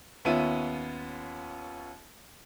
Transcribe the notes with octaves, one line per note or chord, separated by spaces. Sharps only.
D#2 B3 C#4 F4 E5 D#7